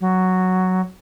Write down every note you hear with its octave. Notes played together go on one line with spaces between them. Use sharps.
F#3